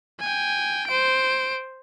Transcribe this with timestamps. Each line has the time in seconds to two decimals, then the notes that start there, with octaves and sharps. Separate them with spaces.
0.20 G5 G#5
0.87 C5 D7